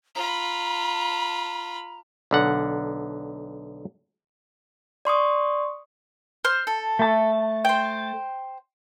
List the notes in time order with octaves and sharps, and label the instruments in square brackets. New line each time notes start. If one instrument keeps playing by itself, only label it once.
[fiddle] F4 B5 [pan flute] A#5
[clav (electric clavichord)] B1 D3 F#5
[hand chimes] D5 C6 C#6 D#6
[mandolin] C5 F6
A4
[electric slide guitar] A3 A5
[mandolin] C5 G5